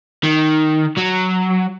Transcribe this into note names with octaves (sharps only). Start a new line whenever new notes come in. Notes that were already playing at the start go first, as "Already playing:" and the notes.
D#3
F#3